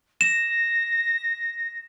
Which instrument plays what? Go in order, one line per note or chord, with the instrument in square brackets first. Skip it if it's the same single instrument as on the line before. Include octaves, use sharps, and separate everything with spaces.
[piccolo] A#6 [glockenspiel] E7